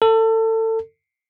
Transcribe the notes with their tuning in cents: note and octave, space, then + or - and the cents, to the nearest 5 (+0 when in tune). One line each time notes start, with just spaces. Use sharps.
A4 +25